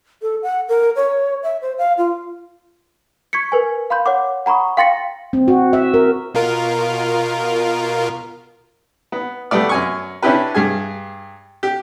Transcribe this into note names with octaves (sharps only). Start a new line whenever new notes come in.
A4
F#5
A#4
C#5
E5
C5
F5
F4
C#6 G#6 B6 C#7
A#4 B4 G#5
F5 B5 C6 G6
C#5 F#5 D6
F#5 A#5 B5 C#6 D#6
F5 G5 C6 A6 A#6 C#7
C4
F#4
E5
A#4
B2 F4 A#4
B3
G3 A3 B3 D5
F#2 G#5 C#6
C#4 D4 E4 G4 B4
G2 G#4 G#5
G4